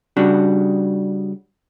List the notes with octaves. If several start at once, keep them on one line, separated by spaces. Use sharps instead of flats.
C#3 G3 D4 F#4